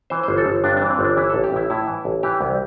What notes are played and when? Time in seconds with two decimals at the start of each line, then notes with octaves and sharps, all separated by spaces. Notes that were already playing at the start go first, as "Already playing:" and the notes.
0.10 E3 C5
0.23 G1 C5
0.38 A4
0.46 G1
0.64 G2 D4
0.77 D4
0.82 E3
0.90 C4
0.99 G1
1.04 D4
1.17 E3 E4
1.30 A1 A4
1.44 G4
1.52 A1 E4
1.70 A2 E4
1.87 E3
2.05 A1
2.23 E3 G4
2.41 C2